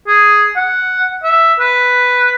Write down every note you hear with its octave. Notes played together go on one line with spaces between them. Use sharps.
G#4
F#5
E5
B4